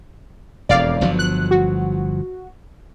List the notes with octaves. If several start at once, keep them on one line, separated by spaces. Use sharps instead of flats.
E1 F2 D5 F5
G1 F3 F#3
F#6
F#4